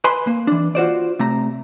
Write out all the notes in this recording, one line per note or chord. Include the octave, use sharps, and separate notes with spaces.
B4 G#5 B5 C6
A#3
E3 D4
F4 F#4 C5 D5
C3 A3 A#5